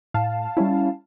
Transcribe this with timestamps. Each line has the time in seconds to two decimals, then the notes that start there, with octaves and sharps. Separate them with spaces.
0.14 A2 F5 A5
0.57 G3 C#4 E4